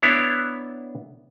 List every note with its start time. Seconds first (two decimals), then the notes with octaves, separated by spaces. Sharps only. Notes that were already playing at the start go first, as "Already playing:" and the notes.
0.02 B3 D4 E4 C#5